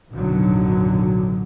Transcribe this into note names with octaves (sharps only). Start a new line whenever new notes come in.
A1 F2 B2 D3 D#3 F#3